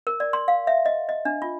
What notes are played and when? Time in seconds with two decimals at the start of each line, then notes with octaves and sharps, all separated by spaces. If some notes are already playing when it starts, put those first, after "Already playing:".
0.07 A#4
0.20 D5
0.33 C6
0.48 F5
0.67 E5
0.86 D#5
1.09 D#5
1.25 D4
1.42 F4